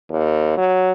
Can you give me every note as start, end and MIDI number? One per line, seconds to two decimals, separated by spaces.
0.10 0.56 39
0.57 0.92 54